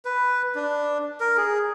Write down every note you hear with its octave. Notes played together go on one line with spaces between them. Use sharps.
B4
D4
A#4
G#4